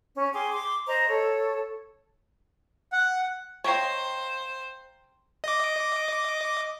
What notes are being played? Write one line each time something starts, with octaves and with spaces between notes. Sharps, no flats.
C#4
G#4 G5 C6 D6
C6 D6
C5 D#5 A#5
A4 C#5
F#5
C5 C#5 D#5 F5 G5 A#5
D#5 D6